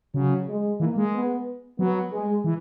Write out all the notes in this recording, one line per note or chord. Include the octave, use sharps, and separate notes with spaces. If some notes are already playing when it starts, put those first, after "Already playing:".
C#3 F#3
G#3
E3 A#3
G#3
B3
F#3 B3
G#3
E3